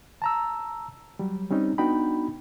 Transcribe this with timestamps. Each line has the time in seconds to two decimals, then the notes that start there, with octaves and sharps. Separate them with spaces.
0.22 A5 A#5 E6
1.19 F#3 G3
1.50 G3 C4 C#4 D#4
1.78 B3 D4 D#4 F#4 G5 B5